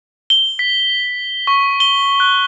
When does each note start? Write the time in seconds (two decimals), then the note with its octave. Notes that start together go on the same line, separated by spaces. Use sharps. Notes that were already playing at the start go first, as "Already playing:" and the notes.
0.30 G7
0.59 B6
1.47 C#6
1.80 G7
2.20 F#6